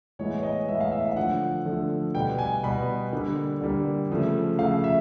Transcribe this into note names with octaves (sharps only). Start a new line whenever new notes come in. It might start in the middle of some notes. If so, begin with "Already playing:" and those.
A2 E3 G#3 B3 C#5
D#5
A2 E3 G#3 B3 E5
F5
E5
F5
D3 F3 A3 F#5
D3 F3 A3
B2 G3 B3 G5
G#5
B2 G3 B3 B5
D3 G3 A#3
D3 G3 A#3
C#3 F3 A3
C#3 F3 A3 F5
E5